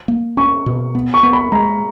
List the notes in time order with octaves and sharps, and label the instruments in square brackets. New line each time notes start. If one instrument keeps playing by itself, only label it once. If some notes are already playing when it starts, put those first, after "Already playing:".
[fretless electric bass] A#3
[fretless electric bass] C#4 [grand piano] C#6
[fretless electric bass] B2
B3
[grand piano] C#6
[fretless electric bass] B3
[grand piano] B5
[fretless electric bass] G#3 [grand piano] A#5